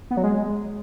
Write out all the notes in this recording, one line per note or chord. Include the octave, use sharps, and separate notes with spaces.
B3
F#3
G#3